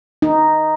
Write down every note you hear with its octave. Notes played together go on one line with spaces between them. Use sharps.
D#4